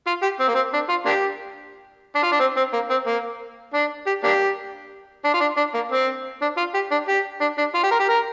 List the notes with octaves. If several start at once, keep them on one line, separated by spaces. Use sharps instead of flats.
F4
G4
C4
A#3
C4
D4
F4
A#3 D4 G4
D4
F4
D4
C4
C4
A#3
C4
A#3
D4
G4
A#3 D4 G4
D4
F4
D4
D4
A#3
C4
D4
F4
G4
D4
G4
D4
D4
F4
G4
A#4
G4
A#4